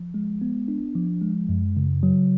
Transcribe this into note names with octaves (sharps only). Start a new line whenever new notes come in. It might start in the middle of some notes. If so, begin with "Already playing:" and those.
Already playing: F3
G#3
B3
D4
F3
G#3
F#2
C#3
F#3